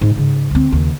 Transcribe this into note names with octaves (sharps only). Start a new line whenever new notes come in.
G#2
G#2 C#3
D2 C4
F#1 D#2